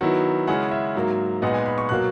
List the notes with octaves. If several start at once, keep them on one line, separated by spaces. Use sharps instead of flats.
D#3 F#3 B3 E4 F#5
C#3 G#3 C#4 E4 F#5
E5
G#2 F#3 A#3
A#2 G#3 B3 D#4 F#5
G#5
B5
C#6
B2 F#3 A#3 F#6